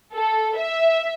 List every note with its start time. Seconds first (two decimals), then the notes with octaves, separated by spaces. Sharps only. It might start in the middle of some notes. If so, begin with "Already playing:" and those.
0.15 A4
0.58 E5